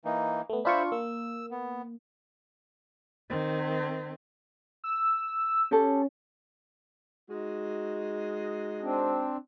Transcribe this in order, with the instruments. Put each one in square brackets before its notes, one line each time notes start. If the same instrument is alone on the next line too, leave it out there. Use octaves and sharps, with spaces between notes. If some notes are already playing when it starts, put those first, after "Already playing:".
[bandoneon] E3 A#3 D#4
[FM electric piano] A3 B3
[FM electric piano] D4 F4 C#6 [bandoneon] C5 E5 B5
[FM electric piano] A#3 [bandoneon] E6
[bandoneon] B3
[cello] D#3 C4
[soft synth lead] E6
[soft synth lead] C#4 [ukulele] G4 A4
[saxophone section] G#3 D#4 F#4
[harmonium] C4 D4